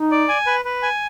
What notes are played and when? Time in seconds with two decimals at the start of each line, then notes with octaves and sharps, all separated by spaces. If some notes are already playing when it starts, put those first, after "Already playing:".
Already playing: D#4
0.11 D5
0.29 G#5
0.47 B4
0.65 B4
0.83 G#5